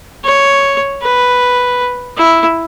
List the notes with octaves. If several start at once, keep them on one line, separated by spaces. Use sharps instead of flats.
C#5
B4
E4